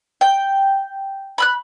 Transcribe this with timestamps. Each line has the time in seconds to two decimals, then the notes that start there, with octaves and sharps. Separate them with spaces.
0.21 G5
1.38 B5 E6 F#6